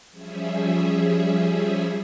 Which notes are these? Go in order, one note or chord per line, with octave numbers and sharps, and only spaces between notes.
F3 G3 C#4 G#4 E5